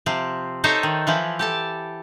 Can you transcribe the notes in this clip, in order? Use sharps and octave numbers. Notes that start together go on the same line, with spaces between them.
C3 F3 C4
D#4 A4 C5 C#5 D#5 E5
D#3
E3 F3 E4
G4 A4 A5